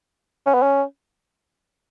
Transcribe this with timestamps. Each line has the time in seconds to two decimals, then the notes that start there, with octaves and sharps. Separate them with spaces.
0.46 C#4
0.54 B3
0.62 C#4